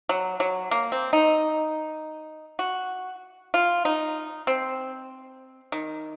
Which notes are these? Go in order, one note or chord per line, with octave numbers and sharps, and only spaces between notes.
F#3
F#3
A#3
C4
D#4
F#4
F4
D#4
C4
D#3